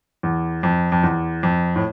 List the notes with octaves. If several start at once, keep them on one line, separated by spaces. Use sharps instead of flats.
E2
F2
F2
E2
F2
A2